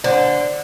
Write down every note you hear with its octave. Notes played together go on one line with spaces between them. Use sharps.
D3 C5 D5